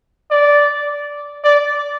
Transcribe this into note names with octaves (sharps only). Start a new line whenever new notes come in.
D5
D5